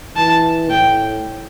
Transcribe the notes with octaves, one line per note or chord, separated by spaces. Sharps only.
E3 A5
A2 G5